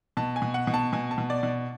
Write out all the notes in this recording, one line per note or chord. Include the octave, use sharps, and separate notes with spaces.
B2 A5
G#5
B2
F#5
B2
A5
B2 G#5
A5
B2
D5
B2